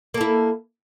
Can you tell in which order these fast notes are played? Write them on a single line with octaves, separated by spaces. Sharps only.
A#3 A4 E4